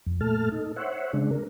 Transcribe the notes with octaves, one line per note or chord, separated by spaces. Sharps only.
F2
A#2 A3 A4 A5 F6
D#4 A4
C5 C#5 E5 F#5
C#3 G#3 D4
A#4